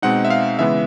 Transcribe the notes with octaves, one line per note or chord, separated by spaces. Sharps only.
B2 G#3 C4 D#4 F#5
E5
F5
C#3 E3 G#3 B3 E5